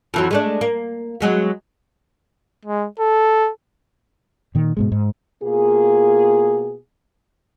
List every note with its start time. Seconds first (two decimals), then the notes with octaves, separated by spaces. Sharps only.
0.14 F2 E3 F#3
0.31 G#3 A3 D4
0.61 A#3
1.21 F#3 G#3 B3
2.65 G#3
3.00 A4
4.55 A#2 D#3
4.77 G#2 B2 G#3
4.92 G#2
5.43 B2 A#3 F4 G#4